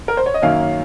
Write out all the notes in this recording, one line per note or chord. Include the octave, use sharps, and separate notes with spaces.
A#4
C5
C#5
D#5
F#2 D#3 A#3 C#4 F5